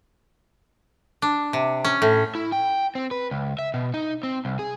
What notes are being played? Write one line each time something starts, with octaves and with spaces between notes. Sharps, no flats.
D4
C3
C#4
A2
E4
G5
C4
B4
C#2
E5
B2
D#4
C4
C2
G#4